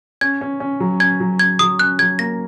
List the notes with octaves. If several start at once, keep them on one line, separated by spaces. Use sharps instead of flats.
C#4 G#6
C#4
C#4
F#3
C#4 G#6
F#3
C#4 G#6
F#3 D#6
C#4 F#6
F#3 G#6
A#3 A#6